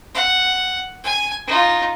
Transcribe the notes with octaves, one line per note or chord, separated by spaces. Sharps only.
F#5
G#5
D#4 F4